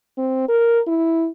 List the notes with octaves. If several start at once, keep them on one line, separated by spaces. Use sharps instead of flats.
C4
A#4
E4